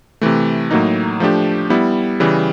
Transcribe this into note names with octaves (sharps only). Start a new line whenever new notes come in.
C3 E3 A3
A2 F#3 A#3 D#4
F3 A3 D4 G4
G3 B3 E4
C#3 E3 G3